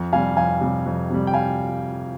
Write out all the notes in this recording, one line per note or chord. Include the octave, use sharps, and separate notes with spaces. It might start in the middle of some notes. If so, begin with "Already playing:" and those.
Already playing: F2
C3 G3 F5 G#5
F2 F5 G#5
C3 G3
F2
C3 G3
G5
F5 G#5